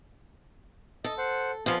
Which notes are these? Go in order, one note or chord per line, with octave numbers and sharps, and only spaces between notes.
A4 D#5
C5 F#5
F2 F3 B3 F5 G#5